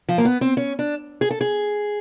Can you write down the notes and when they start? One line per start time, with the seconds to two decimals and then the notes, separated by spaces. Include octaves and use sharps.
0.09 F3
0.18 A#3
0.25 B3
0.41 C4
0.57 C#4
0.79 D4
1.21 G#4
1.30 A4
1.41 G#4